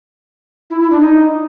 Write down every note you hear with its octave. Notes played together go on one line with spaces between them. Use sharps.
E4
E4
D4
D#4